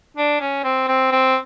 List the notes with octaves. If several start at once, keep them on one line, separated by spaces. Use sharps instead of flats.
D4
C#4
C4
C4
C4